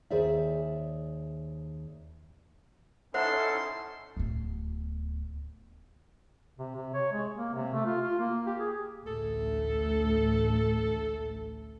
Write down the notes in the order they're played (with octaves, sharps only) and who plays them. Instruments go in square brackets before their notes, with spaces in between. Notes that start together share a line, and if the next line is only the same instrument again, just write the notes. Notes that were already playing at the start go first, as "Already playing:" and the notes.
[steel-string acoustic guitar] D#2 G#4 C5 D5 E5
[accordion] C#4 D#4 E4 [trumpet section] A4 [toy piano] C5 E5 F#5 [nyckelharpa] C6
[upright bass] D1 B3
[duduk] C3
C3
C#5
G#3
A#3
C3
A3
F4
F4
A#3
G4
G#4
[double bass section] A1 D2 A3 [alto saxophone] A4